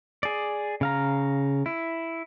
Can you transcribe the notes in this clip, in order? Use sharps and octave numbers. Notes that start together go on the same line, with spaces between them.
G#4 D5
C#3 F5 A#5
E4